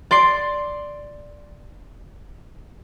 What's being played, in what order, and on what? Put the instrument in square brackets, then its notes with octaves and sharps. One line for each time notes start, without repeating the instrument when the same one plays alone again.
[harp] D5 C6 C7 D7